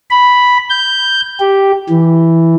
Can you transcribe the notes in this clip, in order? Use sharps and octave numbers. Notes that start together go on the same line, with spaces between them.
B5
G6
G4
E3